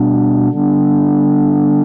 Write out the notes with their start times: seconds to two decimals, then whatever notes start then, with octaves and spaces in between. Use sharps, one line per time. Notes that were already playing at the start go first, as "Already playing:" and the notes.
Already playing: B2 G3 B3 D4
0.50 D3 G3 B3 D4